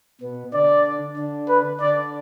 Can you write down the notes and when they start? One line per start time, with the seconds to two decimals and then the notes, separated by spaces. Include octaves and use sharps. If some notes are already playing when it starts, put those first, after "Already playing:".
0.21 B2 B3
0.54 D3 D4 D5
1.17 D3 D4
1.49 B4
1.81 D3 D4 D5